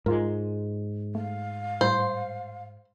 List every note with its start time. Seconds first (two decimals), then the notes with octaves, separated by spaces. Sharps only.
0.06 G#2 G#3 F4 A#4
1.15 A3 F5
1.81 A2 G3 C5